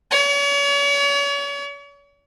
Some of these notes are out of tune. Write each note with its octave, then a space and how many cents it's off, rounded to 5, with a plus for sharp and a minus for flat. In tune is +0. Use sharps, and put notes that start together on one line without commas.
C#5 +40